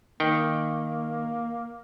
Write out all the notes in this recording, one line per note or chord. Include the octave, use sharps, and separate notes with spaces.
D#3 A#3 G5